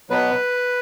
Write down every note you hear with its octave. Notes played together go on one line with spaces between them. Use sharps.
B2 F#3 B3 B4